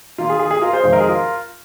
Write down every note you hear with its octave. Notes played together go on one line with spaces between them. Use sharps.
D#3 A#3 F4
G#4
G#4
G#4
F4 A#4
G#4 C5
F2 C3 D#3 G#3 C4 C5 F5
A#4 D#5
G#4
F4 A#4